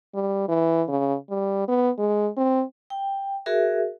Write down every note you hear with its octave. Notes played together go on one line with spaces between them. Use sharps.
G3
E3
C#3
G3
B3
G#3
C4
G5
F#4 G#4 A#4 E5